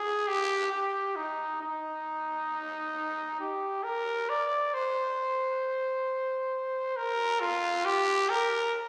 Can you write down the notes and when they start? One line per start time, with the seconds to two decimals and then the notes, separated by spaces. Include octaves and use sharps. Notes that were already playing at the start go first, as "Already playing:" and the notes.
Already playing: G#4
0.28 G4
0.72 G4
1.16 D#4
1.61 D#4
3.40 G4
3.84 A#4
4.29 D5
4.74 C5
6.96 A#4
7.40 F4
7.85 G4
8.30 A#4